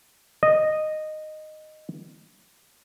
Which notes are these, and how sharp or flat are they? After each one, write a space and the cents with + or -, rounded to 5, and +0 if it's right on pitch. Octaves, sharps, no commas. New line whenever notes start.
D#5 -10